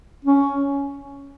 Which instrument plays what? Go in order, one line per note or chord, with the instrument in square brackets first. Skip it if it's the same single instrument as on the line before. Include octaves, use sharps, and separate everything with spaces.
[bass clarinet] C#4